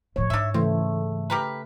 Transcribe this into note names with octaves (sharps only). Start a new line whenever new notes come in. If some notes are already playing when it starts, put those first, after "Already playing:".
A2 F3 C#5
G#2 D4 E5
C#3 E3 A3 C4
G4 A#4 B4